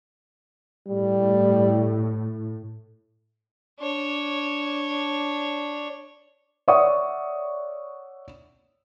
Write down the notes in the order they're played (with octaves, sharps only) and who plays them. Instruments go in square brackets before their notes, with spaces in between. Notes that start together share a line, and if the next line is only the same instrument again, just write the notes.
[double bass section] A2 [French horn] G3
[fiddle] D4 C#5
[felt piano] C#5 D5 E5 F#5 C#6 D#6